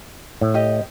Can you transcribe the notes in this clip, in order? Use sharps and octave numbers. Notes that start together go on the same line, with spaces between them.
A2
G4 D#5